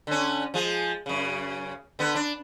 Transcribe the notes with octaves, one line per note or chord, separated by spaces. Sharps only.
D3 C#4
F3 G#3
F#2 C#3
D3 B3
D4